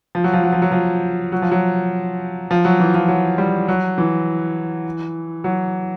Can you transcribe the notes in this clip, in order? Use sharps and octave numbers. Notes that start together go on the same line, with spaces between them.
F3
F#3
F3
F#3
F3
F#3
F3
F#3
F3
F#3
F3
F#3
E3
F3
F#3
G3
F#3
E3
F#3